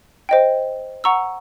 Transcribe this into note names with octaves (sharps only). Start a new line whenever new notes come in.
C5 D#5 G5
F#5 A#5 C#6 E6